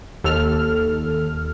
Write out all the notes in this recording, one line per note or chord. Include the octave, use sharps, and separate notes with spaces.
D#2 A4 F6